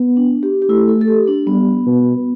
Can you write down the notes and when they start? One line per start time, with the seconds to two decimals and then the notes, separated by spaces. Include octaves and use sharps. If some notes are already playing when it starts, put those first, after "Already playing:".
Already playing: B3
0.17 D4
0.43 G4
0.62 G4
0.69 A3 E4
0.89 A4
1.01 A4
1.08 G4
1.28 D4
1.47 G3 B3
1.86 B2